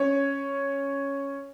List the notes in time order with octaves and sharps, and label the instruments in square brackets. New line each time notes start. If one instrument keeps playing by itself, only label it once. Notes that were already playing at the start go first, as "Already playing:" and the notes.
Already playing: [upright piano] C#4 C#5